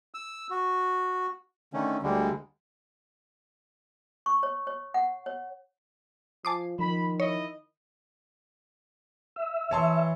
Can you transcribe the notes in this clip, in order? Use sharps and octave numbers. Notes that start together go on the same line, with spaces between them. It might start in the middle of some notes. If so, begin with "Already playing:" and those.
E6
F#4
D3 D#3 A3 C#4
D2 D3 G3 G#3
C#6
C#5
C#5
F#5
C#5
F3 G#5 A5 D6 D#6 C7
D#3 F3 B5
E4 C#5 D#5
E5
E3 C#5 A5 C6